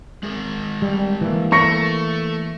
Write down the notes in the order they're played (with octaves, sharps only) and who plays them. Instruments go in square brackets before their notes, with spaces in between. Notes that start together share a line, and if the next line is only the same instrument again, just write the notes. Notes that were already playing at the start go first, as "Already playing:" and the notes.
[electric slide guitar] G#3 G#4 A#4
[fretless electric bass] G3
E3 A#3
[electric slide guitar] A3 [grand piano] C#6 A#6 C#7